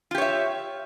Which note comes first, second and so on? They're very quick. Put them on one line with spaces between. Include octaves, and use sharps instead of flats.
F4 G4 C#5 E5